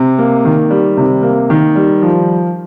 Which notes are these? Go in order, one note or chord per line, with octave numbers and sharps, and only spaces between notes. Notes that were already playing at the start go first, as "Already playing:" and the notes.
Already playing: C3
A#3
D#3
G3
C3
A#3
D#3
G3
F3